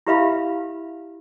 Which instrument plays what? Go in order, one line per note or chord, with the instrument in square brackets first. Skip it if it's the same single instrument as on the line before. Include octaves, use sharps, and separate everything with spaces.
[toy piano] E4 G4 B4 E5 F5 B5